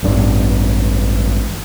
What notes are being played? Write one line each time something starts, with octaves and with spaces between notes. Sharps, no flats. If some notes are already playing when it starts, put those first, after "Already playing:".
A1 G2 D4